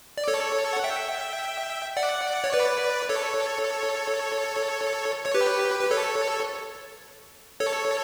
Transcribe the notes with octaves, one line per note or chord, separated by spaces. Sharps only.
D5
A4 C#5
F#5
E5 G5
D5 F#5
C#5
B4 D5
A4 C#5
C#5
G4 B4
B4
A4 C#5
A4 C#5